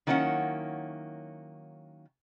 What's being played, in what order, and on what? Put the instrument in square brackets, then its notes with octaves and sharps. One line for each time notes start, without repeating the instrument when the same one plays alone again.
[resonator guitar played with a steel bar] D#3 F#3 A#3 C#4 E4 F#5